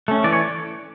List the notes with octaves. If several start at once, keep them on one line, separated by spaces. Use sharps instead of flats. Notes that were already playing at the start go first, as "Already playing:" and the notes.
A3 C#4
E3 D5
C#5